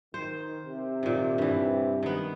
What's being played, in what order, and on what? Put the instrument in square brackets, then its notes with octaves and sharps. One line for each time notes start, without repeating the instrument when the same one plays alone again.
[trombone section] D#3 [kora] C5
[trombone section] C3
[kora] A#2 D#3
G2 E3
D#3 B3